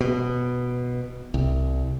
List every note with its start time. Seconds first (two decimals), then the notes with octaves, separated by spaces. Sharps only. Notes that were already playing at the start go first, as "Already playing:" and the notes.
0.01 B2
1.34 C2